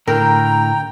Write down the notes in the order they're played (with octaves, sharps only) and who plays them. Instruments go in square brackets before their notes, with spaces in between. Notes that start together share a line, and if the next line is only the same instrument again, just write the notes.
[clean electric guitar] A2 D3 [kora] A#4 [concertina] G5 [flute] A#5